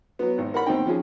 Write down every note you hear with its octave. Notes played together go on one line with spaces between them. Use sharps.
F#3 B3
G#1
A#4 F#5 B5
D#2 C4 D#4 G5
D#3 F3 C#4 G#4